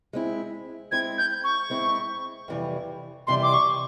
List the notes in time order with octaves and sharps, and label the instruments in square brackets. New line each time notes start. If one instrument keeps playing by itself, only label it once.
[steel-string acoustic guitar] G#3 C4 E4
[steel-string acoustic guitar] G#3 C4 E4 [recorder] G#6
[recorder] G6
C#6
[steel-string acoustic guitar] G#3 C4 E4
F2 C3 E3 G3
[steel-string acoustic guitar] F2 C3 E3 G3 [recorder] C6
[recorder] D6
C#6